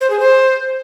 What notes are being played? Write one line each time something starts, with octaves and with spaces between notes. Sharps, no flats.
C5
G#4
C5